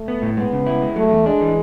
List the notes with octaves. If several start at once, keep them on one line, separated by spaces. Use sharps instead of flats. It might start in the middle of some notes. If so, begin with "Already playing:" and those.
Already playing: A3
B3
A2
G#3 B3
C#3
E4
G#3
F#3 A3
E2
G#3 D4
E3